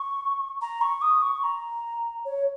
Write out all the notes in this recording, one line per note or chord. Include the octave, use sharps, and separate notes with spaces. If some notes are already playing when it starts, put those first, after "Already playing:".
Already playing: C#6
A#5
C#6
D#6
C#6
A#5
C#5